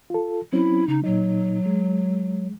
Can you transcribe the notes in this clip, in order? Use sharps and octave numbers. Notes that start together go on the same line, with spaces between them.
F4 A4
F#3 C4 C#4 E4
C#3 D#4
A#2 F#3 D#4
G#3